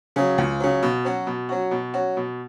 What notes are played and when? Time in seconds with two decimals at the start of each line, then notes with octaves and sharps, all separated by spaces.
0.16 C#3 F#3
0.38 C#2
0.60 C#3 F#3
0.83 B2
1.05 F#3 C#4 F#4
1.27 B2
1.49 F#3 C#4 F#4
1.71 B2
1.94 F#3 C#4 F#4
2.17 B2